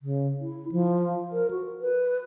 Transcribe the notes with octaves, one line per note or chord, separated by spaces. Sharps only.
C#3
E4
F3
A#4
F#4
B4